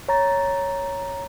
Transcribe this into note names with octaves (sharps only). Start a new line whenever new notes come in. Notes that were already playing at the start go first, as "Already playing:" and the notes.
C#5 A#5 A6